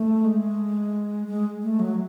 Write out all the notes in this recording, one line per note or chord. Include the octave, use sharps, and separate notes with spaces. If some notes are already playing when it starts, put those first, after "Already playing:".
Already playing: A3
G#3
G#3
A3
F#3